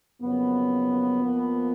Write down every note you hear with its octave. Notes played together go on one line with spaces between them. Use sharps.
F2 C#3 F#3 A#3 B3
F2 F3 A#3